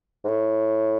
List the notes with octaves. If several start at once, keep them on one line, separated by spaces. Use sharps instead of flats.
G#2
A2